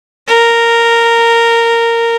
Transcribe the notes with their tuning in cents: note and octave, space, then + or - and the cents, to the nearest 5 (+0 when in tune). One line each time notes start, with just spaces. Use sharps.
A#4 -10